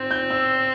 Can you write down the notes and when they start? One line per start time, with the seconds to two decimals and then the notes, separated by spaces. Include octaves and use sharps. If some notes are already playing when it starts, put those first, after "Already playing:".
Already playing: C4 G6
0.11 G6
0.30 E6